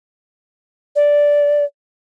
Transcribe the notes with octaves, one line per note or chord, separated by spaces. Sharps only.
D5